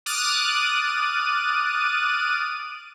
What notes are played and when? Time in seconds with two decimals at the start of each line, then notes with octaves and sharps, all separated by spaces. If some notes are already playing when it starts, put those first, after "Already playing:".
0.06 D6 D#6 F6 F#6 A6 D#7